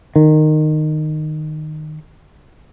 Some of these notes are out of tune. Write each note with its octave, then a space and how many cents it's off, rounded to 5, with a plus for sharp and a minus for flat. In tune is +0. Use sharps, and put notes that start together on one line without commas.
D#3 -15